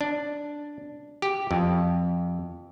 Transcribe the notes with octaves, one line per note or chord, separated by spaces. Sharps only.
D4
G4
F2